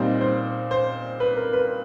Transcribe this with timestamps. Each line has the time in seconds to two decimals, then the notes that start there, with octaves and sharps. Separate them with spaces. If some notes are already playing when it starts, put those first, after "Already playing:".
Already playing: A#2 G3 C4 D#4 C5
0.21 C5
0.71 C5
1.20 B4
1.37 A#4
1.53 B4